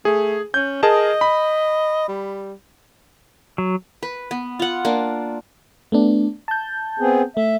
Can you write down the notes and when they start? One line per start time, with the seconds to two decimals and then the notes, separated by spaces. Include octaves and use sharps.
0.05 A3 G#4
0.54 C#4 G6
0.83 G#4 A#4 D#5 A5
1.21 B5
2.08 G3
3.58 F#3
4.03 B4
4.31 B3
4.59 F4 F#5
4.85 A#3 D4
5.92 A3 B3 D4
6.48 A5 G6
7.00 B3 C4 G#4
7.37 A3 E5